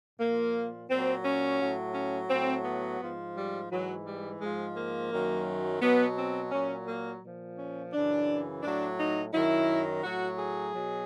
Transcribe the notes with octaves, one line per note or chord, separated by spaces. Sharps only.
A#2 F3 A#3
A#2 F#3 C4
C#4
A2 F#3
C#4
A2 F#3 C4
B3
G#2 F3
G3
G#2 E3 F#3
G3
G#2 F3 G#3
A#3
F#2 D#3 F#3
B2 F#3 B3
C4
A#2 F#3 C#4
A#3
A#2 F3
C#4
F#2 C#3 E3 D4
A2 F#3 D4
D#4
F#2 D#3 F#3 E4
A2 F#3 F#4
G#4
B2 F#3